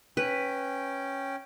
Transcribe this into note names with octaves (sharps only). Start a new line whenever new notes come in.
C#4 B4 G5